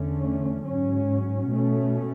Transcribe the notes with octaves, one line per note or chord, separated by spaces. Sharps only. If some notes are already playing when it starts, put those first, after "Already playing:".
Already playing: E2 D3 A3 C#4
G#2 F#3 C#4
B2 A3 C#4